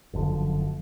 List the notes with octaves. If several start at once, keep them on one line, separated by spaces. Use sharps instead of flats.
F#1 F#2 D3 F3